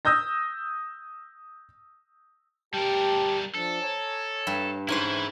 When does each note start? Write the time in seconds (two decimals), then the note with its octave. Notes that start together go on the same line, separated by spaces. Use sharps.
0.05 D#6 E6 G6 A#6
2.74 G3 G4 A#4 G5 A5
3.55 F3 D4 A4
3.82 C#5 G#5 A#5
4.47 G2
4.88 G#2 C#4 E4 B4 C5